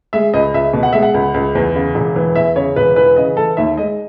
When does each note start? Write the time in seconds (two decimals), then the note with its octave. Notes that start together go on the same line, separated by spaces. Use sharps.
0.13 G#3 E5
0.34 C#2 D#5
0.54 C#2 E5
0.73 B2
0.83 F#5
0.93 G#3 E5
1.03 F#5
1.14 C#2
1.34 C#2
1.55 E2
1.75 C#3
1.95 E1
2.16 E3
2.35 E2 E5
2.56 C#3 C#5
2.76 E1 B4
2.96 E3 B4
3.16 C#3 D#5
3.37 E3 A4
3.57 D#2 E5
3.77 G#3 D#5